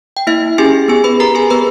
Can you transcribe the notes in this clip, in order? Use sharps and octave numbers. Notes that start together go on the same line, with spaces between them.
G5
A#3 E4 E5
C#4 G4 G#4 G#5
B3 G#4 G#5
B4 B5
G4 A#4 A#5
G#4 G#5
B3 B4 B5